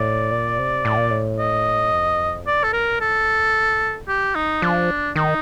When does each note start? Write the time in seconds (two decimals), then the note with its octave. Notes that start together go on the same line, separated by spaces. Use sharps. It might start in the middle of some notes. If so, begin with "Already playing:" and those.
Already playing: A2 D5
0.32 A#2
0.59 C3
0.85 A2
0.97 A#2
1.10 A2
1.39 D#5
1.92 F2
2.46 G2 D5
2.63 A4
2.73 A#4
3.01 A2 A4
3.54 A#2
4.08 G4
4.35 D#4
4.62 F3 D4
5.16 D#3 D#4